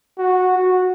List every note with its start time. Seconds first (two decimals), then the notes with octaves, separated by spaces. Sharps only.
0.19 F#4
0.58 F#4